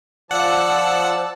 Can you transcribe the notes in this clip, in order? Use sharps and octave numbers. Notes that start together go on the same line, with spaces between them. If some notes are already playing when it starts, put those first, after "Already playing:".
F3 D5 F#5 A5 E6